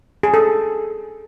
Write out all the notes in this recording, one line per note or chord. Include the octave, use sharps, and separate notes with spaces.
G#4
A4